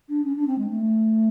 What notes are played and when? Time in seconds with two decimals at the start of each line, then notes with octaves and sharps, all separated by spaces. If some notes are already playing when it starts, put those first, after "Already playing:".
0.09 D4
0.24 C#4
0.35 D4
0.47 C4
0.58 G#3
0.70 A3